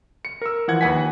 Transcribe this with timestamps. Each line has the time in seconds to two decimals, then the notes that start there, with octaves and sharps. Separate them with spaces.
0.25 C#7
0.42 A#4 E6
0.68 E3 F3 F#5 G#6
0.81 D#2 B4 F#5 G#5 B6